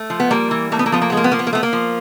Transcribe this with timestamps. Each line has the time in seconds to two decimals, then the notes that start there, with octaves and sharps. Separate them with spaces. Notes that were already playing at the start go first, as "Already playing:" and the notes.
Already playing: A3
0.10 F3
0.20 B3
0.31 G3 A#3
0.51 E3
0.72 A3 A#3
0.79 B3
0.86 A#3
0.92 F3 B3
1.02 A#3
1.10 G#3 B3
1.17 A#3
1.24 B3
1.32 F3 A#3
1.39 B3
1.47 A#3
1.53 A3 B3
1.63 A#3
1.73 F3